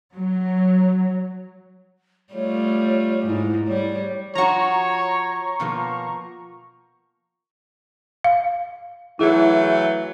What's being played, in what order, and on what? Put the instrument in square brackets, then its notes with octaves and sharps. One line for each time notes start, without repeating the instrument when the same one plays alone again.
[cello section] F#3
[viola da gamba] G3 A3 F4 [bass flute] C#5
[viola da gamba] G#2 [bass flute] E4
[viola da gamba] G3 [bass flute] C#5
[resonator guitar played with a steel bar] F3 F#4 [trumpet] C#5 [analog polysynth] A#5 C#6
[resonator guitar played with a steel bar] B2 F3 A#3
[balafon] F5
[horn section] E3 F#3 A3 [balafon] E4 G#4